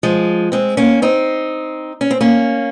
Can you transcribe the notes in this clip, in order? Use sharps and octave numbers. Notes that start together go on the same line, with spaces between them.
F3 G#3
G#3 C4
A#3 C#4
C4 D#4
C#4
C4
A#3 C#4